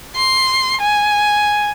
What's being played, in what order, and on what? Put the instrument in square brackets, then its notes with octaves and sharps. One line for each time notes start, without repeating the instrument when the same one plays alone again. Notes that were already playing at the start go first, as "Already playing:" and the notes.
[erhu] C6
G#5